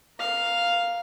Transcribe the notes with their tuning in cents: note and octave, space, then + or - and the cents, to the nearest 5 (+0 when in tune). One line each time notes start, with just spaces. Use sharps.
A#4 +5 F5 +0